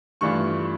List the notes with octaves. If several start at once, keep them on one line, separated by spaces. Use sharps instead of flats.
G2 E3 A3 D4 F4 C#6